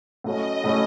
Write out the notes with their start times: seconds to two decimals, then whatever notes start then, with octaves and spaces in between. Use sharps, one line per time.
0.24 A2 F#3 A3 C#4 D#5
0.64 A2 F#3 A3 C#4